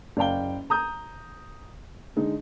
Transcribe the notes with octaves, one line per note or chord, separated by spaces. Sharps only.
F#1 D5 F5 G5 G7
A#5 D#6 G6
D3 G#3 D#4